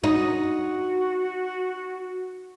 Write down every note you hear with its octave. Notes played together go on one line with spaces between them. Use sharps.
D#4 F#4